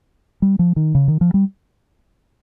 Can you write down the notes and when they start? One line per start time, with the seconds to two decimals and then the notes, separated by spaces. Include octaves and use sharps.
0.42 G3
0.59 F3
0.76 D#3
0.95 C#3
1.08 D#3
1.21 F3
1.34 G3